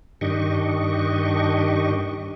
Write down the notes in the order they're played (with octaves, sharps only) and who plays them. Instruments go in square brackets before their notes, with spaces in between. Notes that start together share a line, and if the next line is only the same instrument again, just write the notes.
[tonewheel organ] G2 D#3 D4 G4 D#5 C#6